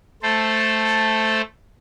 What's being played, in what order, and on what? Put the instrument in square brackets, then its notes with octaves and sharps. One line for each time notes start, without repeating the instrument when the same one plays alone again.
[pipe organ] A3 A4 C5